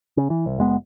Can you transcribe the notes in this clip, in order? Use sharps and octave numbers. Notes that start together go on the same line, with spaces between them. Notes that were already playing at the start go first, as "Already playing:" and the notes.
C#3
E3
C2
F#1 G#3 B3